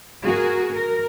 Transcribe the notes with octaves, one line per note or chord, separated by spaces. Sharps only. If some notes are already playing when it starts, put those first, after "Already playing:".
F#4 G#4 A#4
A#4